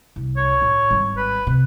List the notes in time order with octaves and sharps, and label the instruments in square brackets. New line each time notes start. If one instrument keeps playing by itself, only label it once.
[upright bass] C2
[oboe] C#5
[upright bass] A1
G#1 G3
[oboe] B4
[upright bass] C3